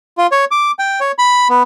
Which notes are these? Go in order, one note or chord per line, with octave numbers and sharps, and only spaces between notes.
F4
C#5
D6
G5
C#5
B5
B3